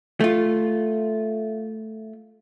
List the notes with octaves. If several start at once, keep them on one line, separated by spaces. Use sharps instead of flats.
A3 F4